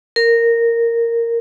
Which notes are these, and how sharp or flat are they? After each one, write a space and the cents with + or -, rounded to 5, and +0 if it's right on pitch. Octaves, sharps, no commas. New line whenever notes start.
A#4 -10